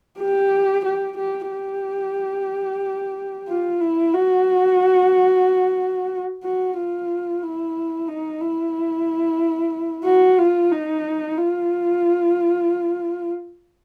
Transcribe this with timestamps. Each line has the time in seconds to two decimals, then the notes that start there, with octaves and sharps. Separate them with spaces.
0.20 G4
0.85 G4
1.18 G4
1.51 G4
3.48 F4
3.81 E4
4.14 F#4
6.44 F#4
6.77 F4
7.43 E4
8.08 D#4
8.41 E4
10.05 F#4
10.38 F4
10.72 D#4
11.37 F4